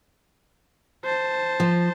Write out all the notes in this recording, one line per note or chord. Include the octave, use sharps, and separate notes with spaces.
C5 A5
F3